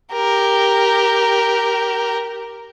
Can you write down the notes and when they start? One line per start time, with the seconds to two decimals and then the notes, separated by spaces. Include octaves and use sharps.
0.13 G4 A#4